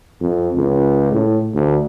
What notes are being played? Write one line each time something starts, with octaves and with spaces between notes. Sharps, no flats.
F2
C#2
A2
D2